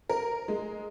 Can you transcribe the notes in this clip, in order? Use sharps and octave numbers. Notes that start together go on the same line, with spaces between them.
A#4
G#3